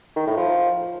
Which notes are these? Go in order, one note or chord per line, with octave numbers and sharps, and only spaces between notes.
D#3
A2
F3